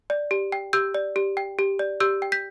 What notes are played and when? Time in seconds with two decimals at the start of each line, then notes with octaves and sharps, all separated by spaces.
0.10 D5
0.31 G4
0.52 G5
0.73 G4 E6 G6
0.94 D5
1.16 G4
1.37 G5
1.59 G4
1.79 D5
2.00 G4 E6 G6
2.22 G5
2.32 G6 B6